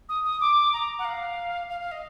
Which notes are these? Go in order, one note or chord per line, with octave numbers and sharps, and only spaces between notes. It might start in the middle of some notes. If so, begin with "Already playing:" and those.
D#6
D#6
D6
A#5
F#5
F5
F5
F5
D#5